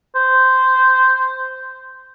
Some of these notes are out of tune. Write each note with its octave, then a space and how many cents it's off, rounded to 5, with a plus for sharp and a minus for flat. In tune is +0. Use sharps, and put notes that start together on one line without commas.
C5 -10